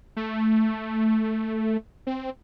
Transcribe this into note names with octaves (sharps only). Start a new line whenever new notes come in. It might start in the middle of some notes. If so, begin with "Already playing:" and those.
A3
C4